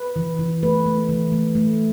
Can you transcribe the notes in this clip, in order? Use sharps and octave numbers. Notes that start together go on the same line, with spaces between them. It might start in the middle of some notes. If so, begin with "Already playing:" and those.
Already playing: B4
E3
E3
A3 B4
A3
E3
A3
A3